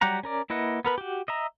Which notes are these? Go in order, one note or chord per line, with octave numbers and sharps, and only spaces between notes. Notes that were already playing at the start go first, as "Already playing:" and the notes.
F#3 G3 G4 F#5 A#5
C#4 A#4 D5
A#3 E4 B4 D#5 F#5
B3 A#4 B4
F#4 G4
D#5 E5 A#5